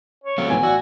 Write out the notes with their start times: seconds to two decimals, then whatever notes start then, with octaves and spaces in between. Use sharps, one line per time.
0.24 C#5
0.38 F#3 A3 C4 F5
0.50 A2 E3 B3 G#5
0.63 F#4 D5 E6